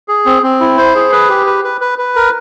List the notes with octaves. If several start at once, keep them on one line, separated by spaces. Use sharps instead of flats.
G#4
C4
C4
E4
C5
G#4
B4
G4
B4
B4
B4
B4
A#4